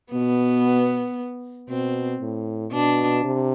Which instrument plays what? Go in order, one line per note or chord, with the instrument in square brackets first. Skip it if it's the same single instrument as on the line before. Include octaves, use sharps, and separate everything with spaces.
[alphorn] B2 [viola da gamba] B3
[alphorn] B2 [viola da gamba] C4
[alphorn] A2
[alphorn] B2 [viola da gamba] D4
[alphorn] C3